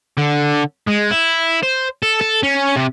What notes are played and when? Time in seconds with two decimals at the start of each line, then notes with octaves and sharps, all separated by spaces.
0.18 D3
0.88 G#3
1.12 E4
1.63 C5
2.03 A4
2.21 A4
2.43 C#4
2.76 C3